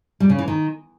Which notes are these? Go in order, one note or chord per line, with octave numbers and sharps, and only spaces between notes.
G3
C#3
E3
D#3